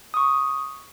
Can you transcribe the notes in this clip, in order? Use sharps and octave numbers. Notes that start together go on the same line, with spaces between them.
C#6 D#6